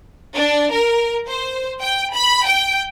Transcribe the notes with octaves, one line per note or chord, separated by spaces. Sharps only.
D4
A#4
C5
G5
B5
G5